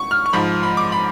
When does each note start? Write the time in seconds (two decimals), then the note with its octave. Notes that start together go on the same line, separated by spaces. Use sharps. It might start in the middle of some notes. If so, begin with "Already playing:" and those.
Already playing: C#6
0.11 F6
0.26 C#6
0.33 G#2 F3 B5
0.63 B5
0.77 D6
0.92 B5